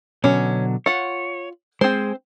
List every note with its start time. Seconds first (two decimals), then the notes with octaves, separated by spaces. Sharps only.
0.24 B2 D3 F#3 C#4
0.86 F4 C#5 F#5
1.81 G#3 C4 G#4 C5